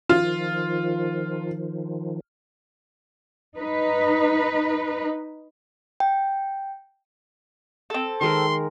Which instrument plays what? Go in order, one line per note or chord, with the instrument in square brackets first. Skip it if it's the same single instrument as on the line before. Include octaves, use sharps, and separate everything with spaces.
[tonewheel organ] D#3 F3 [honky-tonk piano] F4
[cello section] D#4 B4
[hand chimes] G5
[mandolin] C4 A4
[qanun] D#3 G#3 A#4 [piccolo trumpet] C6